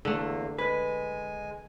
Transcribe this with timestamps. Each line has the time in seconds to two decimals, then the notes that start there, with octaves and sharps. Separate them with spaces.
0.05 E2 D3 A3 A#3
0.58 G#3 B4 G#5